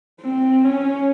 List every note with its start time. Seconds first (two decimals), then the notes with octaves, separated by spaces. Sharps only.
0.22 C4
0.65 C#4